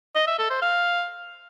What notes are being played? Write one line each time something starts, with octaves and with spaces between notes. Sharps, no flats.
D#5
E5
A4
C5
F5